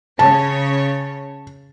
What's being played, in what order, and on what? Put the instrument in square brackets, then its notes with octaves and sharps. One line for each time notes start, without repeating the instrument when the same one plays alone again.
[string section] C#3 C#5 [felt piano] A5